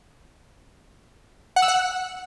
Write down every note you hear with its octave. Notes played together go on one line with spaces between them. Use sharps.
F#5
E6
F#5